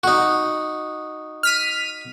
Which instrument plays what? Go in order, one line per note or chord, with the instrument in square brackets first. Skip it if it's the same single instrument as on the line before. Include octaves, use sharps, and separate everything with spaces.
[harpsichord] D#4 F#4
[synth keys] F6 B6 D#7